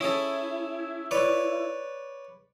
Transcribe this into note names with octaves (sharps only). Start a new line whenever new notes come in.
C#4 E4 G#4 A4
B4 C#5 D5